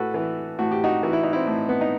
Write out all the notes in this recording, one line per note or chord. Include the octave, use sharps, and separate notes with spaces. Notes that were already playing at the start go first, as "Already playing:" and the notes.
Already playing: A2 F#4 A4 B4
E3
A2 F#4
G4
D#4 F#4
E3 F#4
E4
D#4
C4 E4
A2
B3
D#4